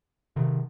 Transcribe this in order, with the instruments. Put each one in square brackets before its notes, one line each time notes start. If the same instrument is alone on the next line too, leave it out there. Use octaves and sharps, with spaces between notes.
[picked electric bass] C3 D#3